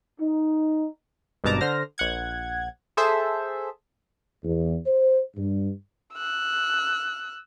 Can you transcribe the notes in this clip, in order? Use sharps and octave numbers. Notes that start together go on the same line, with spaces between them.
D#4
G#1 G2 B2 A5 A#5 D6
D3 C5 F6 A#6
A#1 F#5 G#6
G#4 A4 C5 E5
E2
C5
G2
E6 F#6